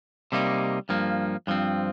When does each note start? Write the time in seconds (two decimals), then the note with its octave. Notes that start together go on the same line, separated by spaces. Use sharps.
0.32 C3 G3 A#3 D#4
0.89 G2 F3 A#3
1.47 G2 F3 C4